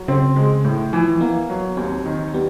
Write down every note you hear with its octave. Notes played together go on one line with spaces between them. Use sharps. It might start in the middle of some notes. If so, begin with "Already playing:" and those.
Already playing: F#3
C#3 C4
G#3
A2
E3 F3
A#3 B3
F#3
D#2 C4
D#3
G3 B3